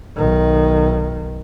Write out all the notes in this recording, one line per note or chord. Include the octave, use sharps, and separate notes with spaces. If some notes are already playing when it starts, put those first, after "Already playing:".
B1 D#3